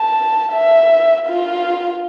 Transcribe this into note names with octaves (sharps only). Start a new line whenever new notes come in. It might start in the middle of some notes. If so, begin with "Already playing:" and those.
Already playing: A5
E5
F4